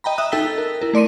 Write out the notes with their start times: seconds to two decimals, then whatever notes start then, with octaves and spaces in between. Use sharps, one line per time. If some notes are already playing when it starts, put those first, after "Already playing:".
0.04 D#5 G5 A#5 B5
0.18 E5 G5 D#6 F#6
0.32 D#4 A4 G5 E6 B6 G7
0.58 A#4
0.81 E4 A#4
0.94 A3 D5 C6 C#7 D#7